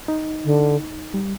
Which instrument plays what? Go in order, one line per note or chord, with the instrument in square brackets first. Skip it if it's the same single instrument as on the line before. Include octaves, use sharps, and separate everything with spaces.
[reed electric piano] D#4
[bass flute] D3
[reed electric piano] G3